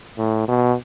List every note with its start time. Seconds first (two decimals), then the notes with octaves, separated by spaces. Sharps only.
0.18 A2
0.48 B2